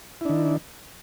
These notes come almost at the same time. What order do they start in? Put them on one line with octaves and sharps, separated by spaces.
E4 D4 D#3